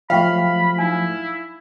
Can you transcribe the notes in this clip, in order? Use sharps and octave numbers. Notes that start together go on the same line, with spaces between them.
F3 F#3 A3 E5 F5 G5 B5 C#6
D#4 E4 G#5